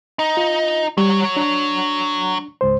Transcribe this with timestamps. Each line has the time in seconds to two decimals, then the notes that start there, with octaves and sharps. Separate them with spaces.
0.19 D#4
0.37 F4
0.98 F#3 G3 C#5
1.37 D4
2.61 C#2 G#2 C5